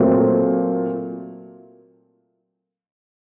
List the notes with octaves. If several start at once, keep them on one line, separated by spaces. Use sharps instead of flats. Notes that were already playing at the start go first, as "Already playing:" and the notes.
Already playing: A#2 F#3 A3 C4